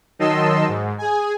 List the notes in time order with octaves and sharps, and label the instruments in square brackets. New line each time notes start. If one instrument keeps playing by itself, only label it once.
[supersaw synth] D#3 F#3 D#5 A5 C6 E6
G#2
G#4 G#5